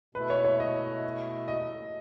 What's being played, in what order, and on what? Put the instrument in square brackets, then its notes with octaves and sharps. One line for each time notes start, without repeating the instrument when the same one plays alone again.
[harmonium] B2 A3 E4 [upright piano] B4
[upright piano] C#5
C#5
D#5
D#5